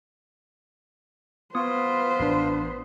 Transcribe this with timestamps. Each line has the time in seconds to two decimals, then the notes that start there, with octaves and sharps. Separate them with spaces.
1.55 B3 F4 B4 C5 D#6
2.20 A1 D4